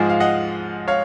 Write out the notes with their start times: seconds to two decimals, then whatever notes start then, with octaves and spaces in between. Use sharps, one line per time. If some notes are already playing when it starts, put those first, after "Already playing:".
Already playing: G#2 F3 G#3 F4 G#4
0.09 F5
0.20 D#5 F#5
0.88 C#5 F5